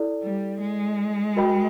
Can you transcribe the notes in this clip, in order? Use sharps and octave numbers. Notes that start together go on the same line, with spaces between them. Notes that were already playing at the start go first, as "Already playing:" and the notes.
Already playing: E4 A4 D5
G3
G#3
F#4 A#4 D#5 G5 B5